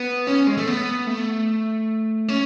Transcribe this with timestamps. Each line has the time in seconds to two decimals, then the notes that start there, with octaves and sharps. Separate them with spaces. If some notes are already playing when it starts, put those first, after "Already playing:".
Already playing: B3
0.27 C#4
0.47 G#3
0.57 A3
0.68 B3
1.07 A3
2.28 C#4